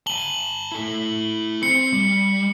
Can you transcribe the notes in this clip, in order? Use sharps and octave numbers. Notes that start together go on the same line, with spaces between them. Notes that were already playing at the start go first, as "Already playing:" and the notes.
G#5 A5 F#7 G7
E4 A4
C4 C5 C#7
G3